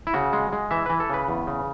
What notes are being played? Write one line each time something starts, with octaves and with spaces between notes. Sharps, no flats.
E4
C#3 F#4
G#3
G#3
E3 E5
E3 B4
A4
C#3 B4
E2
C#3